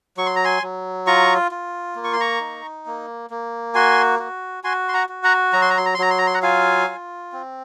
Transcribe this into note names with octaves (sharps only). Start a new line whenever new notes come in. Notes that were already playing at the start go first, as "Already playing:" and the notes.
F#3 C#6
C6
A#5
G#5 C6
F#3
F4 A#5 C#6
F4
A#3
C#6
C6
A#5 C#6
D#4
A#3
A#3
F#4 G#5 C6
F#4
F#4 G#5 C6
C6
F#5 A#5
F#4
F#5 A#5
F#3 A#5
C6
A#5
C6
A#5
C6
F#3 A#5
C6
A#5
C6
F#5 A#5
F4 F5 G#5
F4
C4